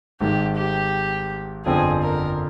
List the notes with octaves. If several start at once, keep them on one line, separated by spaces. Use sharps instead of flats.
G#1 G#2 D#3 G4
G4
G1 F2 D3 F3 C4 G#4
A#4